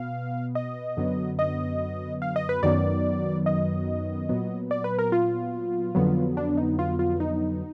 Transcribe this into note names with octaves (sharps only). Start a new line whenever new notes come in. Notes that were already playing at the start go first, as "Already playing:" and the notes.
Already playing: B2 B3 F5
D#5
F#2 D3 F#3 B3
D#5
F5
D#5
B4
F#2 D#3 F#3 B3 D5
D#5
A#2 F#3 B3
D5
B4
A#4
F4
F2 D3 F#3 B3
D4
D#4
F4
F4
D#4